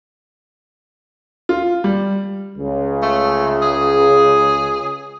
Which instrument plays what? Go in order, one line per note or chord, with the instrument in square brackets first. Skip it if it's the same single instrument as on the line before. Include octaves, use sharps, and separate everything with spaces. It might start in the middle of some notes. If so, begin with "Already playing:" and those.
[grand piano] F4
G3
[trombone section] C#2 C#3
[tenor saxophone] A3
G#4